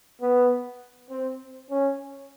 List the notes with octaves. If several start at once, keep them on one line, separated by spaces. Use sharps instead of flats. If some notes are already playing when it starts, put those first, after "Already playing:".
B3
C4
C#4